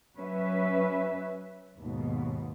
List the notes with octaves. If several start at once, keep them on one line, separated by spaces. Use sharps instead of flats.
F#3 C#4 B4 E5
D#2 G#2 B2